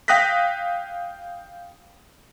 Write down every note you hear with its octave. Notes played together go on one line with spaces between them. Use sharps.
F5 G5 D#6 F#6 A#6 B6